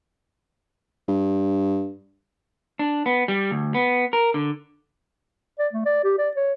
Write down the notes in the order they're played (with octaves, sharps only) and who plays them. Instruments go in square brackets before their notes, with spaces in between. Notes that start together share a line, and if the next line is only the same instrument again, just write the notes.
[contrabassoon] G2
[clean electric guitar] D4
B3
G3
D2
B3
A#4
D3
[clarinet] D5
A3
D5
G4
D5
C#5